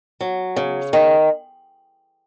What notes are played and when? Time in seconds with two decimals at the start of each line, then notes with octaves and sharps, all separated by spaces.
0.21 F#3
0.56 C#3
0.93 D#3